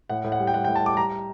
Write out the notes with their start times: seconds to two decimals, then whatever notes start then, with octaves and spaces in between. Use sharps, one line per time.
0.09 A2 F#5
0.24 A2
0.32 F#5
0.40 G3
0.47 G5
0.53 G3 F#5
0.64 G5
0.68 A2
0.75 A5
0.83 G3 D6
0.97 G3 A#5